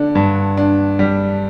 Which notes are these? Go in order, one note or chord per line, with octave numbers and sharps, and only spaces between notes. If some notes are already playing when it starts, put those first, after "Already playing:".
Already playing: D3 D4
G2
D4
G3